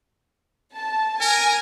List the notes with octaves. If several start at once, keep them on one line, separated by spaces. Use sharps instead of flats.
A5
A#4 G#5